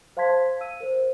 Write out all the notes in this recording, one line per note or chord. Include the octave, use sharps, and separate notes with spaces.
C5 F5 A5 C6 G#6 B6
F5 E6 D#7
A#4 C5